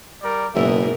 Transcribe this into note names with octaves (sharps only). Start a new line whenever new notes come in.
G3 A#4 D5
F#1 G#2 B2 A#4 E5